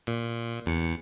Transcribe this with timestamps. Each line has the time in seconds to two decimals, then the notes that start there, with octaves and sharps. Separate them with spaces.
0.07 A#2
0.66 E2 C#7